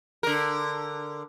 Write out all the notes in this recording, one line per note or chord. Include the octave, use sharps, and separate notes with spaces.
D3 A#4